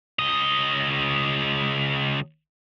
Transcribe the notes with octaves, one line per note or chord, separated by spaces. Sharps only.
C#2 D#5